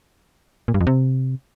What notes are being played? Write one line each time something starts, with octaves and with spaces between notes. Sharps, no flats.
A#2
G2
F2
C3